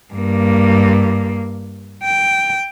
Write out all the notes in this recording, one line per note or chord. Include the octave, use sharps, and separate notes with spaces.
G2 A#3
G5